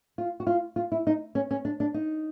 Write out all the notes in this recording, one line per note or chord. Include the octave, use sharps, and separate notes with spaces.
F4
F#4
F4
F4
E4
D#4
C#4
C#4
D4
D4
D#4